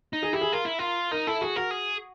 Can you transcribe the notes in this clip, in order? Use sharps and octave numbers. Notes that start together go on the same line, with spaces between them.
D#4
G#4
E4 G4
G#4
F4 A#4
E4
F4
D#4 A#4
E4 A4
F#4 G#4
F#4 A#4
G#4